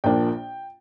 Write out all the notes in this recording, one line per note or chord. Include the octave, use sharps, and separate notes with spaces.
A#1 A#2 A#3 D4 G5